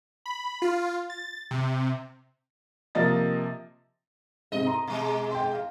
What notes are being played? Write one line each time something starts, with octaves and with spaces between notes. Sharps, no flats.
B5
F4
A6
C3
C3 F3 A#3 D#5 A6
G#2 C3 D#5
A#5 C6
B2 G#3
G5 C6
F5